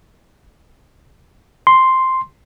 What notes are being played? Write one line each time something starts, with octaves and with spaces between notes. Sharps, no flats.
C6